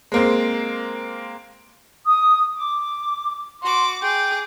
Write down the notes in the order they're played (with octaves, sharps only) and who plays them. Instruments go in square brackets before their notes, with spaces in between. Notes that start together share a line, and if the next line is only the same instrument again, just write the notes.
[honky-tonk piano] G#3 A#3 C4
[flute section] D#6
D6
[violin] F#4 D6 [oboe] C6
[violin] G#4 D6 [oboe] G5